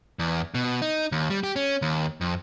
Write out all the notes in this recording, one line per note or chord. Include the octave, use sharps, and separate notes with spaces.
E2
B2
D#4
D#2
G3
G4
C#4
D#2
F2